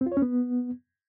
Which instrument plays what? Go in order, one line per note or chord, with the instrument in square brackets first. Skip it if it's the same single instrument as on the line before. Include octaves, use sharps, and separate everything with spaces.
[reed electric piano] C4
F4
C#5
C#4
B3